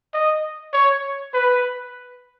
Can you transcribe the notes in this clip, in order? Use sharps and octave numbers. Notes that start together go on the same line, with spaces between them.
D#5
C#5
B4